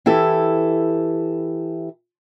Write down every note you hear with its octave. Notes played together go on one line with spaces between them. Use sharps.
E3 E4 G4 A4